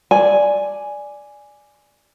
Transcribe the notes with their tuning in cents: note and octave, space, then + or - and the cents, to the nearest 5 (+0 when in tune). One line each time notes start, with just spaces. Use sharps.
D5 +0 G#5 +0